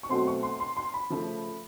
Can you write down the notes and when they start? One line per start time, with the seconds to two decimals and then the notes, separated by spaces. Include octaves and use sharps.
0.03 C#6
0.09 B2 F#3 A3 C4 C6
0.27 C#6
0.43 C6
0.60 C6
0.77 C6
0.94 B5
1.10 C#3 F3 A3